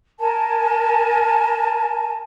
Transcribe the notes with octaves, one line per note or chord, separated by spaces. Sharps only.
A#4 G#5 A5